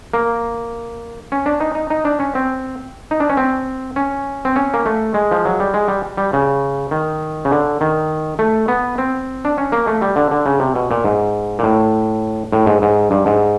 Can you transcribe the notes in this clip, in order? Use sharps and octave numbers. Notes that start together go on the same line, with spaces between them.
A#3
C#4
D4
D#4
D#4
D#4
D4
C#4
C4
D#4
D4
C#4
C4
C#4
C4
C#4
A#3
A3
G#3
F3
F#3
G3
G#3
G3
G3
C#3
D#3
C#3
D3
D#3
A3
B3
C4
D4
C#4
A#3
A3
G3
D3
D3
C#3
C3
B2
A#2
G#2
A#2
A2
A2
G#2
G#2
G2
G#2